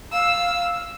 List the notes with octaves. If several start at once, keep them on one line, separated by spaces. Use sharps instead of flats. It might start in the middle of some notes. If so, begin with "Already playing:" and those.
F5 E6